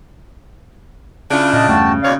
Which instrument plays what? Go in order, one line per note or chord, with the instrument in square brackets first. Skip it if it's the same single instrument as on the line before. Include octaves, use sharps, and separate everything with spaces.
[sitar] C#3 [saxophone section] D4 E4 F4
[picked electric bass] A#2 [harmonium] D#5 A5
[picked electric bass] E2 G2 A3 [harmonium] F#4 G5 A5
[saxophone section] D#2 C#5 [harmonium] B2 D5 F5